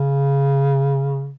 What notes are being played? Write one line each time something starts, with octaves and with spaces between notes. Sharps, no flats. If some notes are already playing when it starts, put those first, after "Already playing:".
Already playing: C#3